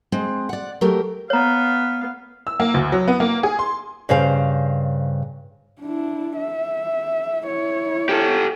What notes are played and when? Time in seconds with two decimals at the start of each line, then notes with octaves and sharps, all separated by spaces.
0.12 G#3 C4
0.49 D5 F#5
0.81 F#3 A3 G4 A#4
1.30 B3 C#5 F5 A#5
2.47 E6
2.60 A#3
2.74 D2
2.92 F#3
3.08 B3
3.20 A#3
3.43 G#4
3.59 C6
4.09 G2 C#3 C5 F5
5.81 D4 E4
6.37 E5
7.43 E4 C#5
8.09 G4 A4